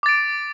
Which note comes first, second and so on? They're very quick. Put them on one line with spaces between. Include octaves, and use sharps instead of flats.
D6 A6 D7